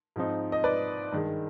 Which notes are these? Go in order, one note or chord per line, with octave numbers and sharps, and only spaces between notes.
G#2 F3 C4 D#4
D#5
B4 D5
G2 D#3 G#3